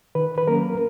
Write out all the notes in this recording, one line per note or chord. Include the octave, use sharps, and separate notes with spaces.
D#3 B4
B4
F#3 A#3 C#4 A#4